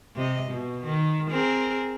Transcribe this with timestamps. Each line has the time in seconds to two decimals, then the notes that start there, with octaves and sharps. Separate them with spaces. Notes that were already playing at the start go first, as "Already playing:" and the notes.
0.16 C3 D#5
0.51 B2
0.84 D#3
1.30 C4 G#4 A#4